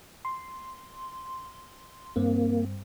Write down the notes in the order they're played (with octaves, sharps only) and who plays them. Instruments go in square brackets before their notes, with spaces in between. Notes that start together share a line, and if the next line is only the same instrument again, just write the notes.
[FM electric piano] C6
[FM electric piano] G2 C4 [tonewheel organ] A#3